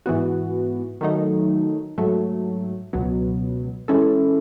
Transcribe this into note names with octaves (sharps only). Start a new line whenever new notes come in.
G#2 E3 B3 F#4
D#3 F#3 A3 D#4
G#2 F#3 A3
C#2 B2 F#3 B3
E3 G#3 C#4 E4 A4